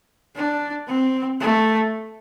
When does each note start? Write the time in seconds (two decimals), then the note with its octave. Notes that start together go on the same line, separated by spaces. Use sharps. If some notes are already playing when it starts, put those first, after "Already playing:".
0.36 D4
0.87 C4
1.40 A3